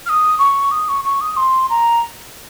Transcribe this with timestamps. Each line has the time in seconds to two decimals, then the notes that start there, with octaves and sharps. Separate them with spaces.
0.06 F6
0.09 D#6
0.39 C#6
0.71 D#6
0.89 C#6
1.04 C#6
1.21 D#6
1.37 C6
1.70 A#5